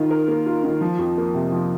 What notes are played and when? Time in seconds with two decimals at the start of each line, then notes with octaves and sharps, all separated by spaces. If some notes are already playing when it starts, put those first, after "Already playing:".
Already playing: D#3 F4
0.11 A#4
0.28 A#3
0.46 F4
0.63 D#3
0.81 F3
0.98 F2
1.17 A#3
1.35 C3
1.52 F3